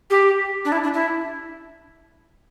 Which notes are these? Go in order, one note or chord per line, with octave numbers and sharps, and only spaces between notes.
G4
D4
E4
D4
E4